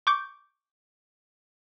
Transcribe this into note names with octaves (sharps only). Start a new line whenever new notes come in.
C#6 D6 G6